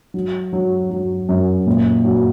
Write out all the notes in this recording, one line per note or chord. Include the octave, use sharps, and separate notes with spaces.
F#3
F#3
F#3
F#2
A#2
F#3